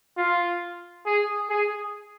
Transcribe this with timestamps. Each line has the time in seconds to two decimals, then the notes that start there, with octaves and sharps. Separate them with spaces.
0.18 F4
1.06 G#4
1.50 G#4